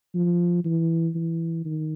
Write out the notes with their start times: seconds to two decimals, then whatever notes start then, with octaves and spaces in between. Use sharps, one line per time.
0.14 F3
0.65 E3
1.15 E3
1.65 D#3